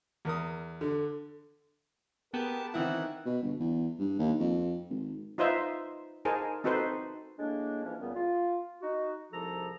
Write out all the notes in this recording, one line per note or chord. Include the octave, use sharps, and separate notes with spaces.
E2 A#4 D#6
D3
B3 G4 G#4 A#4 B4 A5
D#3 E3 C4 E4 F#5
B2
G1
E2
G2
D#2
F2
G#1
D#4 F4 B4 C5 D#5 E5
D#4 G#4 A#4 C5 G#5 A5
C4 D#4 F#4 A4 B4 C5
A2 G#3 A#3 D4
E3 F3 C#4
C#2 A#2 G3 B3
F4
D#4 F#4
C2 G#2 F3 A4 A#5